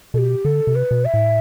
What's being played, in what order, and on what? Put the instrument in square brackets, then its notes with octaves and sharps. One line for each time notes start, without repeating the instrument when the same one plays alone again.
[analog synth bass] B2 [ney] A4
[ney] G4
[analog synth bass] D3 [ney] A4
[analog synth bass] C3
[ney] B4
[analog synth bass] B2
[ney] E5
[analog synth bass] A2